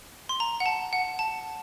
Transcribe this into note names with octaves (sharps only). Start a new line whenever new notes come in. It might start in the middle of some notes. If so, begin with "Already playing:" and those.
C6
A#5
F#5
A5
F#5
A5